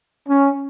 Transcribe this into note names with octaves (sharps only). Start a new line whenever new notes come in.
C#4